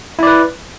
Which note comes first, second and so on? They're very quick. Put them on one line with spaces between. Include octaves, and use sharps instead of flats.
E4 D5 B4